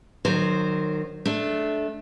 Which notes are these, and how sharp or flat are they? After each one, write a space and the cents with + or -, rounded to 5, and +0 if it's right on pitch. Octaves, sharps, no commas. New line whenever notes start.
D#3 -30 F#3 +0 C5 +0
A3 -20 D4 +0